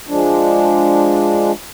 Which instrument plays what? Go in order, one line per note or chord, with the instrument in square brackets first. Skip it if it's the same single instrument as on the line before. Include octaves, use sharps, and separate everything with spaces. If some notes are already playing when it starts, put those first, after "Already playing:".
[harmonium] F3 G#3 D4